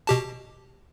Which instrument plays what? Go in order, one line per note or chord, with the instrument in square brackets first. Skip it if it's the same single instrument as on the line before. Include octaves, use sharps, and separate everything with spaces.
[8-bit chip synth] B2 G4 A5